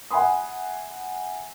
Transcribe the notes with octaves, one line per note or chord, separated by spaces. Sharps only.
E5 F#5 G#5 B5 C6 D#6